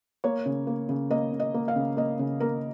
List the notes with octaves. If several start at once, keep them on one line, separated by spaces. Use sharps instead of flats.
A#3 C#5
C#3
A#3
C#3
A#3 D#5
C#3
D#5
A#3
F5
C#3
A#3 D#5
C#3
A#3 A#4